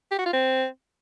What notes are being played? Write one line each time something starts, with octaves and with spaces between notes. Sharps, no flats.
G4
F#4
F4
C4